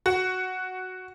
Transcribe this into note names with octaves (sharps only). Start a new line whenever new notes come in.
F#4